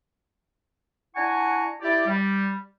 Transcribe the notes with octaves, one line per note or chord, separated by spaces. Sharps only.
D4 E4 F#5 G#5 A#5 C#6
E4 G4 D5
G3